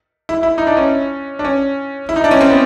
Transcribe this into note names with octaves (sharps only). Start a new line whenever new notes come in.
E4
E4
D#4
D4
C#4
D4
C#4
E4
D#4
D4
C#4
C4
B3